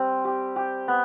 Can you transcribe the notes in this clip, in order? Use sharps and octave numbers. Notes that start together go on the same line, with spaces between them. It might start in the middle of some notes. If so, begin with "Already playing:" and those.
Already playing: G3 C4
G4
G4
B3